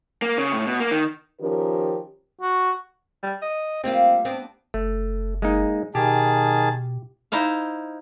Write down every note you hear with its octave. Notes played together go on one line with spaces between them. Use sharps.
A#3
C#3
A2
B2
A#3
D#3
D#3 F3 C#4 G4 A#4
F#4
G3
D#5
G3 A#3 C4 F4
B3 C4 D4
F#1 A3
G#3 A#3 D#4
B2 D#3 G4 G#4 A5
D#4 E4 C5 F5